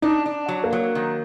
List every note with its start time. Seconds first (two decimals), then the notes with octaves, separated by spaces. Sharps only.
0.02 D4 D#4
0.26 D4
0.48 F#3
0.64 A#3
0.73 F#3
0.95 D#3